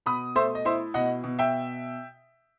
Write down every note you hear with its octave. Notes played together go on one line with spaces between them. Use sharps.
B2 B5 D#6
A3 C5 E5
D#5
E4 C5 E5
B2 D#5 F#5
B2
E5 G5